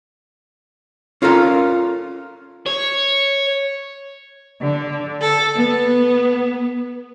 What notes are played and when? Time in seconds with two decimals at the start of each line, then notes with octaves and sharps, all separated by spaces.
1.22 C#4 F4 A4 A#4 F5
2.66 C#5
4.61 D3
5.18 A4
5.54 B3